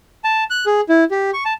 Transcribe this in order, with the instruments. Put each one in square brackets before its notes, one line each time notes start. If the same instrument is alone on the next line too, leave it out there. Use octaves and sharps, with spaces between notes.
[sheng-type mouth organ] A5
F#6
G#4
E4
G4
C#6
A5